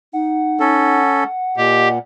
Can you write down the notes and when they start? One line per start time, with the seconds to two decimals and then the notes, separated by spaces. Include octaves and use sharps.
0.13 D#4 F#5
0.60 C#4 A4
1.57 A#2 G4 D#5